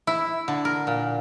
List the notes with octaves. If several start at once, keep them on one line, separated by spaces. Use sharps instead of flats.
E4
D3
A#4
A#2